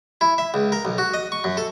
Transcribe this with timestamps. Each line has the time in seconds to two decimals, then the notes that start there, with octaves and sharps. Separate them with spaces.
0.21 E4
0.38 E5
0.54 C#2
0.72 A#4
0.85 B1
0.98 F#4
1.14 D#5
1.32 C#6
1.44 F#2
1.57 A4